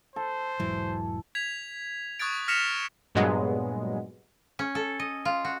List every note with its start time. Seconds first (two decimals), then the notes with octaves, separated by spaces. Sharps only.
0.16 A4 C5
0.60 E1 G#2 E3 F#3
1.35 G#6 B6 F7
2.19 C#6 D#6 F#6 G#6 A6 D7
2.48 F6 A#6 B6 C#7 E7 F7
3.15 G2 A#2 F#3 G#3 B3
4.59 C#4
4.75 A4
5.00 D#5
5.25 F4
5.45 F#4